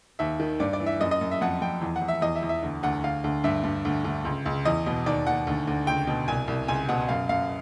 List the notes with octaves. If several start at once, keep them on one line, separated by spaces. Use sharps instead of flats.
D#2 E5
D#3
G2 D5
D5
E3
E5
F#2 D#5
D#5
F#2
E5
F2 F#5
F2 G5
E2
F#5
E2
E5
E2 D#5
E5
E2
E5
D2
D2 F#5
D2 F5
D2
G2 E5
G2
D2
D2
C#2
C#2
E2 D#5
B2
D#2 D5
D#2 F#5
D2
D2
C#2 G5
B2
C2 G#5
C2
C#2 G#5
B2 F#5
F#2 F5
F#2 F5